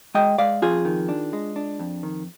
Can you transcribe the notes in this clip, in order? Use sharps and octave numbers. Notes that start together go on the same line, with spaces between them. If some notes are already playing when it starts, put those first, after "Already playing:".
G#3 D#5 G5
G#3 D5 F5
F2 F4 G#4
D#3
D4
G#3
D4
F2
D#3